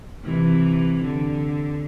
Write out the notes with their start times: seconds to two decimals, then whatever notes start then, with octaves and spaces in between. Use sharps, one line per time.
0.24 C3 E3
1.03 D3